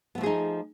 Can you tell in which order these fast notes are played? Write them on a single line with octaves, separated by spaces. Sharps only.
B3 A3 F3 G#4 D#4